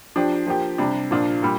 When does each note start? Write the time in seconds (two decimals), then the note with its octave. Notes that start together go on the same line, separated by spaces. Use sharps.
0.16 F3 D4 G4
0.46 F3 A#3 G4
0.78 C3 G3 D4
1.11 A#2 F3 D4 F4
1.42 A#2 G3